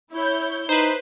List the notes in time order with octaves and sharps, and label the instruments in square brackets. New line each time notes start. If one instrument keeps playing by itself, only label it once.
[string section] E4 C#5 G6
[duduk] D#4 [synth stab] B4 C5